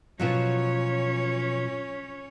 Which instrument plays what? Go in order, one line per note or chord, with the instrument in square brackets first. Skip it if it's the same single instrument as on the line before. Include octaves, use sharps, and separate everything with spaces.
[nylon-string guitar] B2 F3 F#3 [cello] C#4 C#5